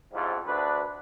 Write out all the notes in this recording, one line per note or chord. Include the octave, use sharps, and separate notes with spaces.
F2 G#2 C#3 G3 E4 F4
D2 D4 B4